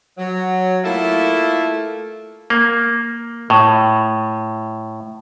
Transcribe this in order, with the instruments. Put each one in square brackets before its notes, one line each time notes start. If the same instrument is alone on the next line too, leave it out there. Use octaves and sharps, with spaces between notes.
[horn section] F#3
A3 A#3 E4 F4 A4
[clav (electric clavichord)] A#3
A2